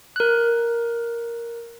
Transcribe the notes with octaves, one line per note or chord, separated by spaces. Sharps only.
A#4 F#6